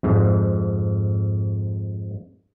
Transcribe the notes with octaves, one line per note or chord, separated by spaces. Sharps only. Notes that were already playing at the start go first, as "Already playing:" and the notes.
F2 G#2